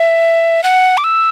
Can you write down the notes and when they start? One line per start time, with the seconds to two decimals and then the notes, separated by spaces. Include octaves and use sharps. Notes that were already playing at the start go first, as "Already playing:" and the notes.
Already playing: E5
0.64 F#5
0.97 D6
1.04 E6